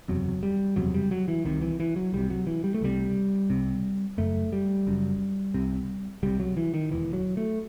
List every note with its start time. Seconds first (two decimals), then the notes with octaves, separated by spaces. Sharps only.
0.08 F#1 E2 C3 F#3
0.43 G3
0.76 F#1 E2 C3 F#3
0.94 G3
1.11 F#3
1.28 E3
1.45 C2 C3 D#3
1.61 E3
1.80 E3
1.96 F#3
2.13 C2 C3 G3
2.30 F#3
2.47 E3
2.64 G3
2.74 A3
2.81 C2 C3 G3
3.50 C2 C3
4.18 F#1 F#2 A3
4.53 G3
4.87 F#1 F#2
5.54 C2 C3
6.23 C2 C3 G3
6.40 F#3
6.57 E3
6.74 D#3
6.91 E1 D#2 E3
7.13 F#3
7.37 A3